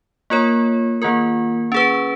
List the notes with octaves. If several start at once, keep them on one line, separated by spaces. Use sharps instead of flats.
A#3 F4 A#4 C#5
D#3 A#3 F4 A#4
C#4 G#4 B4